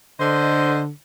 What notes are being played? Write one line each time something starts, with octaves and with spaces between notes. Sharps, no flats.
D3 C5 D#5